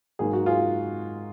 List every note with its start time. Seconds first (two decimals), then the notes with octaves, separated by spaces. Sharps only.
0.19 G#2 F#3 A#3 G#4
0.33 F#4
0.46 F4 G#4